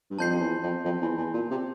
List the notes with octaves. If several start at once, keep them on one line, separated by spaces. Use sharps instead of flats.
G2
F2 A5 C6 G6 C7
F2
E2
F2
F2
E2
E2
A#2
C3